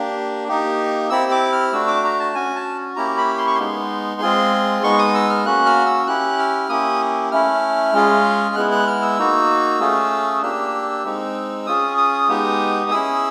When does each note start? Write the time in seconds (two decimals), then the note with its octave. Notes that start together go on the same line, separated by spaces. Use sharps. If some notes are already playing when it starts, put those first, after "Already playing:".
Already playing: A#3 D4 G4
0.48 A#3 D#4 G4
1.10 C4 E4 G4 E6
1.31 D6
1.52 F6
1.73 A3 D4 F#4 E6
1.88 D6
2.04 A#5
2.19 A5
2.34 C#4 F#4 G#5
2.56 A5
2.96 A#3 C#4 E4 G4 A#5
3.17 B5
3.38 C6
3.47 C#6
3.55 G#3 B3 D#4 C6
4.21 G#3 C4 F4 G#4
4.83 G#3 B3 D#4 C#6
4.99 D#6
5.14 E6
5.30 F6
5.45 A#3 C#4 F#4 F#6
5.66 F6
5.86 E6
6.07 C#4 E4 G4 F#6
6.39 F6
6.69 A#3 C#4 E4 G4 D#6
7.32 A3 C#4 E4 F6
7.94 G#3 C#4 F4 G#4
8.56 G#3 B3 E4 F#6
8.71 F#6
8.87 F6
9.02 E6
9.18 A#3 D#4 F#4
9.80 A3 C#4 F4 G#4
10.42 A#3 D4 G4 E6
11.05 G#3 C4 D#4
11.66 C#4 F4 G#4 D#6
11.98 D#6
12.28 G#3 B3 D#4 G4
12.90 C#4 E4 G#4 E6